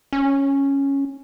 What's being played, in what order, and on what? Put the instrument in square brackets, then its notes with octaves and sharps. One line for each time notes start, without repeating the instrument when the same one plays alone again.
[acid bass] C#4